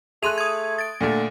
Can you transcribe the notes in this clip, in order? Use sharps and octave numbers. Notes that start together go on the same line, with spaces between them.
A3 G#4 C6 F#6 D#7 F7
D#6 G#6
A6 D7
A#2 D3 A3